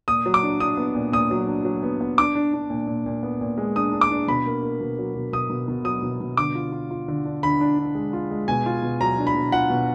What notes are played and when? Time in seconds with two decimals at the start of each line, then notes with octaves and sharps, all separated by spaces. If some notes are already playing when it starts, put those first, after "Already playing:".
0.08 A#2 D#6
0.26 F#3
0.34 D6
0.43 D4
0.60 D4 D#6
0.77 B3
0.95 A#2
1.12 A#2 D#6
1.31 F#3
1.47 D4
1.65 F#3
1.83 B3
2.01 B3
2.18 D4 D6
2.35 D4
2.53 D4
2.70 A#2
2.87 A#2
3.06 A#2
3.23 B3
3.41 A#2
3.58 G#3
3.76 D4 D#6
3.92 D4
4.01 D6
4.11 D4
4.28 B2 B5
4.46 A#3
4.63 A#3
4.81 B2
4.98 F#3
5.15 B2
5.33 B2 D#6
5.50 B2
5.68 B2
5.85 F#3 D#6
6.02 B2
6.20 B2
6.37 D3 D6
6.55 F4
6.72 F4
6.91 F4
7.08 D3
7.25 D4
7.43 D3 B5
7.61 D4
7.79 D4
7.95 G#3
8.13 F4
8.31 G#3
8.48 B2 G#5
8.66 F4
8.83 B2
9.01 F#3 A#5
9.18 D4
9.27 B5
9.35 B2
9.52 F4 F#5
9.70 B2